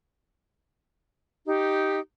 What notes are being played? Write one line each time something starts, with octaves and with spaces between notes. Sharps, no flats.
D#4 G4